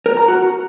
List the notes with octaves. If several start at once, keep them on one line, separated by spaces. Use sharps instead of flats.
A#4
A#5
F#4